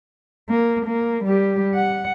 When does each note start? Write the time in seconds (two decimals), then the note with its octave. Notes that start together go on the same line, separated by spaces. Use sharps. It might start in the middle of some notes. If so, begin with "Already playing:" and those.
0.49 A#3
0.85 A#3
1.24 G3 G4
1.75 F#5